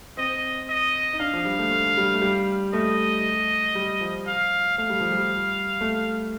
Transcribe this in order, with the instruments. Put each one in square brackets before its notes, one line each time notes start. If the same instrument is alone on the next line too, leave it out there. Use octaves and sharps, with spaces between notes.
[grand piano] C4 [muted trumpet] D#5
[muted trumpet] D#5
[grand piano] D#4
[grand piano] D4 [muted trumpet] F5
[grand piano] F3
G3
A3
A3
G3
A3
G3
[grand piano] A3 [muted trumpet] D#5
[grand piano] G3
F3
[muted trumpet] F5
[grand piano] A3 [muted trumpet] F5
[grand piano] G3
F3
G3
A3